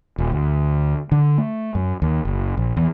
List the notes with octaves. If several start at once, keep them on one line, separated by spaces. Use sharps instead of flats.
D#1
D2
D3
A3
F#2
D#2
F#1
A#1
E2